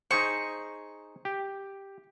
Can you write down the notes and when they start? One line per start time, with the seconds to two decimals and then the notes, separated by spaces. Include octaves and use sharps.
0.11 D#4 G#4 C5 C#6
1.25 G4